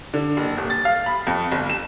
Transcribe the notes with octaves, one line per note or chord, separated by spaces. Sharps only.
D3
F#1
D#1
A6
F5
B5
F2
G1
E7